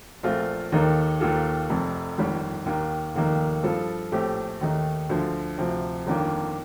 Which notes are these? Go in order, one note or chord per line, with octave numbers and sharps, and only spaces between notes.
A#1 A#2 A3 C4 F4
D#2 D#3 A#3 D#4 A4
D#2 D#3 A#3 F4 A4
F1 F2 C3
G1 F2 D#3 G3
D#2 D#3 A#3
F1 D#2 D#3 A#3 D#4
G2 F3 C4 F4 A4
A#1 A2 A3 C4 G4
D#2 D#3 A3 D#4
D2 D3 F3
D2 C3 F3 C4
G1 F2 D#3 A#3 D4